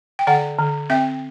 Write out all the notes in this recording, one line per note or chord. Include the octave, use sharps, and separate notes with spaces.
G5
D3 D5 F#5
D3
C4 E5 G5